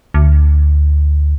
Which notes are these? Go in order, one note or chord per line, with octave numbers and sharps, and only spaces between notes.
D2